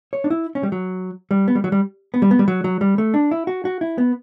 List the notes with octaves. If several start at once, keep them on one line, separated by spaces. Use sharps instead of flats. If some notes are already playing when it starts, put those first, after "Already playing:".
C#5
D4
E4
C#4
G3
F#3
G3
B3
G3
F#3
G3
B3
G3
B3
G3
F#3
F#3
G3
A3
D4
E4
F#4
F#4
E4
B3